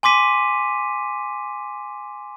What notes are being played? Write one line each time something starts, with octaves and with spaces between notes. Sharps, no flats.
G#5 C6 D6 B6 D#7